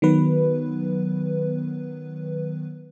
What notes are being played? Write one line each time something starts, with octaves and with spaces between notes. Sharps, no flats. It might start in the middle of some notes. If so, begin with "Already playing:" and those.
D#3 F#3 B3 B4